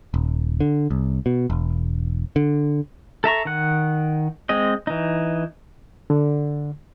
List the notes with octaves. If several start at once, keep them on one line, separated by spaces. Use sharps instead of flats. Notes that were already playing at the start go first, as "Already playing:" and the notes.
D#1
D3
C2
B2
E1
D3
A4 E5 A#5 C#6
D#3 F#5
G#3 C4 D#5
E3 D#4
D3